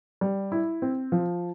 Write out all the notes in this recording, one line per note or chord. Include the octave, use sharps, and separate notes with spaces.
G3
E4
C4
F3